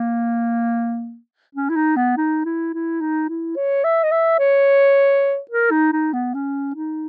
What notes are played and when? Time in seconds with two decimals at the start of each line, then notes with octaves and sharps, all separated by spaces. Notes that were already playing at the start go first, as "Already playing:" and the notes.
Already playing: A#3
1.55 C#4
1.70 E4
1.76 D#4
1.97 B3
2.17 D#4
2.45 E4
2.74 E4
3.01 D#4
3.29 E4
3.57 C#5
3.84 E5
4.04 D#5
4.12 E5
4.39 C#5
5.51 A#4
5.71 D#4
5.92 D#4
6.13 B3
6.34 C#4
6.75 D#4